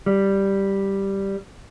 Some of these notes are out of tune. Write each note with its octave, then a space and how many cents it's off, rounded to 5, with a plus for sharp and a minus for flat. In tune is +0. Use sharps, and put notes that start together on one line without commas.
G3 +0